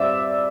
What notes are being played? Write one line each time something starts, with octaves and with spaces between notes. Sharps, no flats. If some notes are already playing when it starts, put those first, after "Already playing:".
Already playing: G3 C4 D5 E5 D6 E6